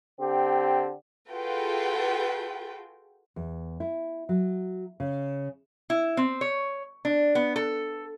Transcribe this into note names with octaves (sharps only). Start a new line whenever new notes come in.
D3 C4 G4
F4 F#4 G#4 A4 B4 G5
E2
E4
F#3
C#3
E4
C4
C#5
D4
B3
A4